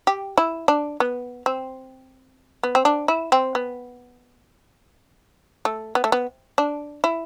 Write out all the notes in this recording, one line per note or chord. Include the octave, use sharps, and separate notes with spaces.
G4
E4
D4
B3
C4
B3
C4
D4
E4
C4
B3
A3
B3
A3
B3
D4
E4